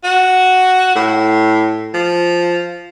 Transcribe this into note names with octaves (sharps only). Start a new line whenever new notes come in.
F#4
A2
F3